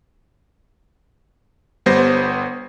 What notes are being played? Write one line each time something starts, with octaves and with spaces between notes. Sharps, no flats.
G1 G3 B3 C5 A#6